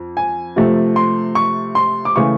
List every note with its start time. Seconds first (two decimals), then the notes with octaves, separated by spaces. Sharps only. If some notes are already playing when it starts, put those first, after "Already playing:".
Already playing: F2
0.17 G#5
0.56 C3 F3 A3
0.96 C6
1.35 C#6
1.75 C6
2.05 D6
2.16 C#3 E3 A3 C#6